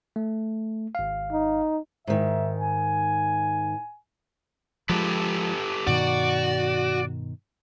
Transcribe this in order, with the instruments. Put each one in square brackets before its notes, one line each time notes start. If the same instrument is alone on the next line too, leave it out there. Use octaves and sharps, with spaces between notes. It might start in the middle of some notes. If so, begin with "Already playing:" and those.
[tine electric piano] A3
G#1 F5
[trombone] D#4
[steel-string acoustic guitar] G#2 D#3 [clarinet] E5
[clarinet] G#5
[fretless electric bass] F3 G#3 [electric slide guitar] G4 A4 B4
[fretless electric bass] G2 B2 D#3 [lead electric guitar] F#4 [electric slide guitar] D5